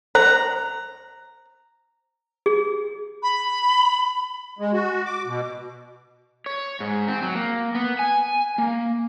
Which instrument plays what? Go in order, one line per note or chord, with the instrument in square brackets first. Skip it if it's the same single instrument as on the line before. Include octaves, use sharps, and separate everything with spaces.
[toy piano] C5 [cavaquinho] A#5
[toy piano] G#4
[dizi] B5
[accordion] G#3
F#4
D6
B2
[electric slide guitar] C#5
G#2
C4
F#3
A#3
B3
G#5
A#3